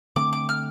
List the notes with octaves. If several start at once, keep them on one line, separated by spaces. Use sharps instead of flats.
D3 A3 C4 D6
D6
F6